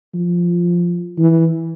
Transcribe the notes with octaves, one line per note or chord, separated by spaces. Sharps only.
F3
E3